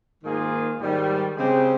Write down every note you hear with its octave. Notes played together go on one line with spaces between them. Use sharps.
G#2 D#3 A#3 F4 G#4
G#2 D#3 G3
C#3 G#3 C4 G4